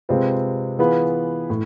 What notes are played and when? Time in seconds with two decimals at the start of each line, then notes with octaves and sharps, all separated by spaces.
0.09 C3 G#3 C4 F4 B4
0.79 E3 B3 F4 G#4 B4
1.50 A2